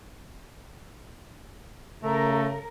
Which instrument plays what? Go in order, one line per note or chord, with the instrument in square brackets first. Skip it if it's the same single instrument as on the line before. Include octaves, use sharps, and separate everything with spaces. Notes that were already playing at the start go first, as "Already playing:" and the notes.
[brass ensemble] C#3 [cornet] A3 [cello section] A#4